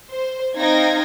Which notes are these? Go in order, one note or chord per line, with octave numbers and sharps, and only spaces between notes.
C5
C4 D#4 F5 G5 G#6 A#6